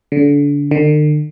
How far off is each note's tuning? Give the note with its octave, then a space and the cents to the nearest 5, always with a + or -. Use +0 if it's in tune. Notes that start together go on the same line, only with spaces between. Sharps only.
D3 -30
D3 +45